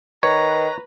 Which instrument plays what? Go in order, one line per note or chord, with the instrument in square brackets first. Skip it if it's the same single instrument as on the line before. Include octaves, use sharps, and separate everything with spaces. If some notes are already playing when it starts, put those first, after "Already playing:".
[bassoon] D#3 [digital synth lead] B4 [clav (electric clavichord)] C#5 [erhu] A#5